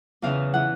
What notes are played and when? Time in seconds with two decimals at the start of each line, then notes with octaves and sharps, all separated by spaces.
0.22 E2 C#3 E3 F5
0.54 E3 F#5